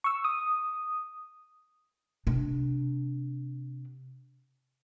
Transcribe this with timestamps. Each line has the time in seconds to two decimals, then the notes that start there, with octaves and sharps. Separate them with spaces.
0.04 C#6 E6
0.24 D#6
2.27 C3 D4